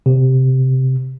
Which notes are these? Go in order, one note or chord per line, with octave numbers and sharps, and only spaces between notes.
C3